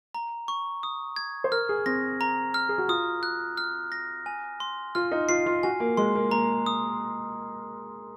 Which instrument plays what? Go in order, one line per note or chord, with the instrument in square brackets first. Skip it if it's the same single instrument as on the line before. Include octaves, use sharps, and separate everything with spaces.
[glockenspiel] A#5
C#6
D#6
G#6
[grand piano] C5
[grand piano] A#4 [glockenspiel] F6
[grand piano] G#4
[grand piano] C4 [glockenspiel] A#6
[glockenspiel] A#5
F6
[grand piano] G#4
F#4
[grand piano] F4 [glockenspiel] D#6
[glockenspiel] F#6
F6
A#6
G#5
C6
[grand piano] F4 [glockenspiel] F6
[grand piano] D#4
[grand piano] F4 [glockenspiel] C7
[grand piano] F4
[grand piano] F#4 [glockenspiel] G#5
[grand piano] A#3
[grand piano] G#3 [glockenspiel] C6
[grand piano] A#3
[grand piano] A#3 [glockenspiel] A#5
[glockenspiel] D#6